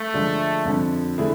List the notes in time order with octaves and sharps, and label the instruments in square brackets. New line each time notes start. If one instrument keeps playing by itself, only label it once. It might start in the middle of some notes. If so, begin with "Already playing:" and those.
Already playing: [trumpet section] A3
[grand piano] D3 F3 G#3 D4
F2 D3 F3
D3 A3 E4 G#4